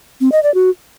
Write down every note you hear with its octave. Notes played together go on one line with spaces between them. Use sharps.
C4
D#5
D5
F#4